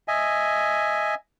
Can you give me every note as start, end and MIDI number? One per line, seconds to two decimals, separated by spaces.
0.08 1.15 75
0.08 1.15 76
0.08 1.15 80